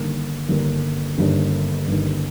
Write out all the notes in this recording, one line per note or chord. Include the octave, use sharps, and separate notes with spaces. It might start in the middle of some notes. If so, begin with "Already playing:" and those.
Already playing: G1 G2 D#3 A#3
G1 G2 D#3 A#3
G1 G2 D#3 A#3
G1 G2 D#3 A#3